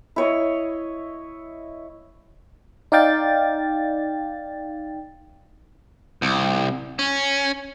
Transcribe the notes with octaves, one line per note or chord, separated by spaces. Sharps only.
E4 C#5 D#5
D#4 D5 F5 G5 A6
C2
C#4